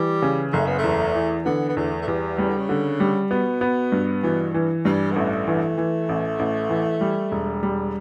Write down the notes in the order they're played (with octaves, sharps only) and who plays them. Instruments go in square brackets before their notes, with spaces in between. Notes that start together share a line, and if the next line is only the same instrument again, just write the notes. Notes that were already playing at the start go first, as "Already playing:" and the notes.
Already playing: [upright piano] E3 [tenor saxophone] G3
[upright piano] C#3
[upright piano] F#1 [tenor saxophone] A3
[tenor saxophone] B3
A3
[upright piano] E2
E3
[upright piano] D3 [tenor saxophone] B3
[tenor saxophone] B3
[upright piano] E2 [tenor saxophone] A3
[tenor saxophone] A3
[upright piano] E2 [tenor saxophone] G3
[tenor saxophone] C#3 [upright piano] G3
[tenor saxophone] D3
C#3
[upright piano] D3
G3
[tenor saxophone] B2 [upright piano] B3
[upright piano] B3
G2
[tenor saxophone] B2 [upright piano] E3
[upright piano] E3
[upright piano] G2 [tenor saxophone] G3
[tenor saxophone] B3
[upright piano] A1 [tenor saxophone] A3
[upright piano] E3
E3
A1
A1
E3
G3
E1
G3